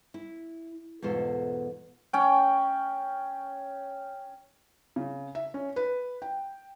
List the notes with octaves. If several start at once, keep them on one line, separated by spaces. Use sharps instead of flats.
E4
E2 G#2 B2 F4 A4
C#4 G5
C#3
E5
C#4
B4
G5